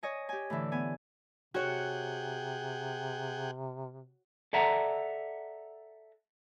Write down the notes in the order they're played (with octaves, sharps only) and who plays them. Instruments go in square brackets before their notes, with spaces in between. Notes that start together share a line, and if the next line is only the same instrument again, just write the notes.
[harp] C#5 D#5 G#5
G4 G#5
A2 D3 E3
B3 G#5
[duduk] C3 [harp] F#4 C#5 [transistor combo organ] G#4 F#5 G5
[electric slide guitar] A4 D5 E5 F#5 A#5